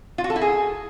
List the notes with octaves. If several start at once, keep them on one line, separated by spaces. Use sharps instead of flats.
F4
F#4
A4
E4
G#4